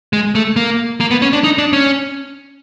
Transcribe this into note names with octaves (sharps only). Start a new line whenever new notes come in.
G#3
A3
A#3
A#3
B3
C#4
D4
D#4
D4
C#4